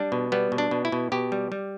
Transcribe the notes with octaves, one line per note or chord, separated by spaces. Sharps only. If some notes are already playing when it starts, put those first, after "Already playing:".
Already playing: G3 D4
B2
G3 B3
B2
D4
B2
E4
B2
B2 G4
G3
G3